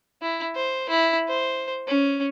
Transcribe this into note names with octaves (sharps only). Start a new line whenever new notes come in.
E4
C5
E4
C5
C#4